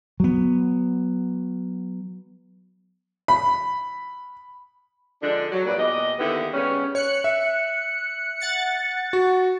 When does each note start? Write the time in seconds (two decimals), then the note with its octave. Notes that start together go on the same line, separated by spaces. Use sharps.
0.20 F#3 B3
3.28 B5
5.22 D3 F3 G#3 D4
5.51 F#3
5.65 G2 A#2 B4 D5
5.78 E2 A#2 G4 D#5
6.19 D3 D#3 A#3 B3 E4 G4
6.53 C#3 G3 B3 C#4
6.95 C#5 F#6 C#7
7.24 E5
8.40 F#5 A6 C#7
9.13 F#4